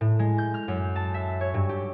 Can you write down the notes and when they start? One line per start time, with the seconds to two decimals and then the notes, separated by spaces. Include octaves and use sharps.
0.01 A2
0.19 G#3
0.38 G6
0.54 F6
0.68 F#2
0.96 A5
1.14 E5
1.41 C#5
1.54 G2
1.69 G4